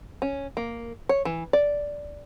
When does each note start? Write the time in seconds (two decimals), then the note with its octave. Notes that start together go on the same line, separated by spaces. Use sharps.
0.22 C#4
0.57 A#3
1.09 C#5
1.25 E3
1.53 D5